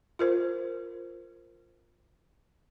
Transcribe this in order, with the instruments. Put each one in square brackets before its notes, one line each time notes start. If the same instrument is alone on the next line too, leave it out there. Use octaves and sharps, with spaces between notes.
[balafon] F4 A#4 C5